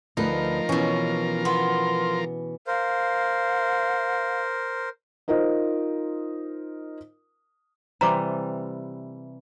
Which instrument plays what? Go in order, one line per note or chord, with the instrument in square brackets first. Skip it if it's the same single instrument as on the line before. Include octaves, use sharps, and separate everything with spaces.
[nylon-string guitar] D2 B4 [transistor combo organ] F3 A#4 [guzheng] D#4
[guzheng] B2 C#4 [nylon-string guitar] E3
[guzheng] B3 [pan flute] C6
[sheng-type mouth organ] A#4 C5 [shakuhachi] F5
[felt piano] D#4 F4 A#4 C5 D#5
[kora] C3 E3 G3 [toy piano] A#5 C6 D6